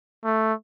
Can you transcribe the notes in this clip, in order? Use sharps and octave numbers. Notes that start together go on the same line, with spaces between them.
A3